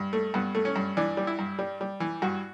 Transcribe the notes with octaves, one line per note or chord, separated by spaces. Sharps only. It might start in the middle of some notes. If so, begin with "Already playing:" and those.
Already playing: G2
A3
G2 B3
A3
C#4
G2
E3 D4
G3
E4
G2
G3
G3
E3
G2 F#4